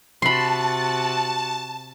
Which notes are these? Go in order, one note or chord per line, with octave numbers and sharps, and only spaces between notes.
C3 F#4 A5 B5 C6